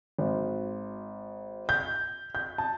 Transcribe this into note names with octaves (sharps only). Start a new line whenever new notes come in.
G#1
G6
G6
A5